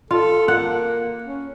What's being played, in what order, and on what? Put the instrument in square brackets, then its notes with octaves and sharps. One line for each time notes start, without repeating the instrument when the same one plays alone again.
[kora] F4 [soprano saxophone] A4
[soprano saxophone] A#3 [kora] F#5
[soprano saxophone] C#4